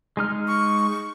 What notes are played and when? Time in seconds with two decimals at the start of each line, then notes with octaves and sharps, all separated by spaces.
0.17 G#3 D#4 F6
0.47 C#6